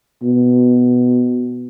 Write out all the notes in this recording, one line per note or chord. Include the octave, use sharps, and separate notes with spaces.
B2